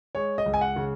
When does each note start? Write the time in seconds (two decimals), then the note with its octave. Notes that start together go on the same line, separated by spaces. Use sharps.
0.15 G#3 C#5
0.38 D#5
0.46 C#2
0.54 G#5
0.61 F#5
0.76 C#3